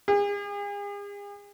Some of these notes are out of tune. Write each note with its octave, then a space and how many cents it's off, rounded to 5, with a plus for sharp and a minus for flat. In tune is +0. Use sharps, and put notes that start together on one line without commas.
G#4 -40